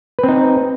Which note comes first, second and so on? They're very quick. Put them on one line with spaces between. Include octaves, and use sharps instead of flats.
B4 C4 D#4